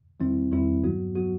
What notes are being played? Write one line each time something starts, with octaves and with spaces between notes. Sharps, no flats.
E2 D#3 G3 C4 E4
E2 D#3 G3 C4 E4
G2 F#3 B3 F#4
F#3 B3 F#4